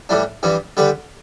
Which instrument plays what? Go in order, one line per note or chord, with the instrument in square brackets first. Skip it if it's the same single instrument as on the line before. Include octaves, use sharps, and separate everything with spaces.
[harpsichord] A2 E3 G3 D4
G2 E3 G3 B3
D3 G3 B3 G4 B4